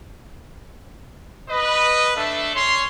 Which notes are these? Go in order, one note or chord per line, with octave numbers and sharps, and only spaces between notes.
B4 D#5
A3 D4 A4 E5
C#4 C#5 C6